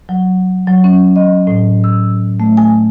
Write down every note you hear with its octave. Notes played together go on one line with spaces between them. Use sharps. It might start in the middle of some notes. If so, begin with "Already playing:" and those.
F#3
F#3
C#4
D#5
A2
E6
A3
G#5